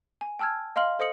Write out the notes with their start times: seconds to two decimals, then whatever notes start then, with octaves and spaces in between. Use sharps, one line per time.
0.21 G#5
0.39 G5 A5 E6 F6 G#6
0.76 D#5 F5 C6 F6 F#7
0.99 A4 C5 D#5 D#6 C#7 F#7